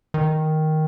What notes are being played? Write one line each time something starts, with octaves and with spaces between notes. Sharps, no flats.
D#3